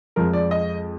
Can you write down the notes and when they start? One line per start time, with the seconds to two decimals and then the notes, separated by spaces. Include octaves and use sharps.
0.16 F2 F3 G#3 A#4
0.33 D5
0.51 D#5